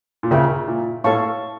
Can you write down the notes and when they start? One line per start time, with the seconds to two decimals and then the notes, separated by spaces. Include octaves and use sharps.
0.23 A#2
0.31 C#3 A#4 E5 G5 C#6
0.68 A#2
1.04 A2 A4 C#5 F5 A5 C#6